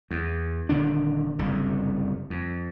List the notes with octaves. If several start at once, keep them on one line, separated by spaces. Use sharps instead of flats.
E2
D#1 D3 D#3 D4
F#1 C2 G2 D3
F2